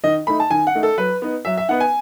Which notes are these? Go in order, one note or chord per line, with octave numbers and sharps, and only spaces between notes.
D#3 D#5
A3 D#4 B5
A5
D#3 G#5
F#5
A3 D#4
A4
F#3 B4
B3 D#4
F#3 E5
E5
B3 D#4 F#5
G#5